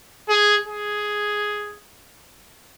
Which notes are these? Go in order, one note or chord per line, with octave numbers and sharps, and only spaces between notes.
G#4
G#4